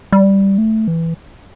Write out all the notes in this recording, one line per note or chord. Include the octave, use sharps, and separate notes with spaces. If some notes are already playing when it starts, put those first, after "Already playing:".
G3
A3
E3